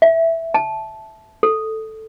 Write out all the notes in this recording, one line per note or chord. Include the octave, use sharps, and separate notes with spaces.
E5
A5
A4